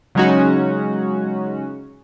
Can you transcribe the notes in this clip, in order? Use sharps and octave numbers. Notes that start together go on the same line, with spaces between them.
C#3 F#3 G#3 C#4 D#4 F#4